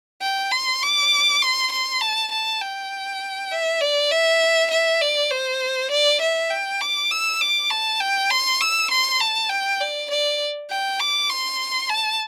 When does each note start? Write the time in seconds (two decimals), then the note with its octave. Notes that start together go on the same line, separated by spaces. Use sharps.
0.22 G5
0.52 C6
0.82 D6
1.42 C6
1.72 C6
2.01 A5
2.32 A5
2.62 G5
3.51 E5
3.81 D5
4.11 E5
4.71 E5
5.01 D5
5.31 C5
5.91 D5
6.21 E5
6.51 G5
6.81 D6
7.11 E6
7.41 D6
7.70 A5
8.00 G5
8.30 C6
8.61 E6
8.91 C6
9.20 A5
9.50 G5
9.81 D5
10.10 D5
10.71 G5
11.00 D6
11.30 C6
11.90 A5